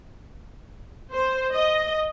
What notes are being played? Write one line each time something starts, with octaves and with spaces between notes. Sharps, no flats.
C5
D#5